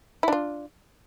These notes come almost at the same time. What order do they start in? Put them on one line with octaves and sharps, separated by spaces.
E4 D4 F4